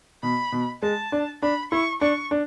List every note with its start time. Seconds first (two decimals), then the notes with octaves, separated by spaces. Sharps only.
0.23 B2 B5
0.52 B2
0.82 G#3 A5
1.12 D4
1.42 D4 B5
1.72 E4 C#6
2.01 D4 C#6
2.31 D4